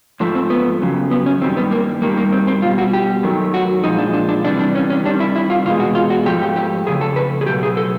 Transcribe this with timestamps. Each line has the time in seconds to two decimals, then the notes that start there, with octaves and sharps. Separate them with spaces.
0.20 G#2 F3 A3
0.35 C4
0.50 B3
0.81 F2 C#3 F#3
1.11 B3
1.26 C#4
1.41 G2 D#3 G3 C4
1.57 B3
1.71 A#3
2.02 G2 D#3 G3 A#3
2.18 A#3
2.32 C4
2.47 C4
2.62 B2 G3 F4
2.78 F#4
2.93 G4
3.23 F#2 D#3 F#3 A3
3.54 F#4
3.84 A#2 F3 G#3 D#4
3.98 D4
4.13 D4
4.29 D4
4.44 C3 E3 G3 D4
4.59 D4
4.75 C#4
4.90 C#4
5.05 C3 D#3 G3 D4
5.20 E4
5.36 E4
5.50 F4
5.65 E2 B2 G#3 F4
5.80 F#4
5.95 F4
6.10 F#4
6.26 G#2 F3 A3 G4
6.42 G4
6.56 G4
6.86 F2 C#3 A3 G#4
7.01 A4
7.16 B4
7.41 G#4
7.46 B2 F#3 A3 G4
7.63 G#4
7.77 A4